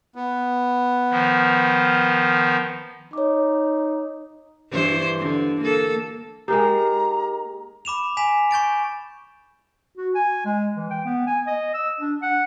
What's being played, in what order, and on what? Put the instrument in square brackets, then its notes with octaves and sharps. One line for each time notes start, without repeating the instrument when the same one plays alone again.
[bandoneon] B3
[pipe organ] D#3 F3
[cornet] D#4 [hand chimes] C#5 D6
[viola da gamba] G2 E3 C5
D3
A#3 A4
[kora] G#3 A#3 D#4 [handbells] G4 A#4 [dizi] A#5
[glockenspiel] B5 D6 E7 F7
G#5 B6 E7 F7
C#6 G6 A6 D7
[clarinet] F#4
G#5
G#3
E3
G5
B3
G#5
D#5
E6
D4
F#5